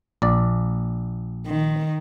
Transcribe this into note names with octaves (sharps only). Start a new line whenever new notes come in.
A#1 D5
D#3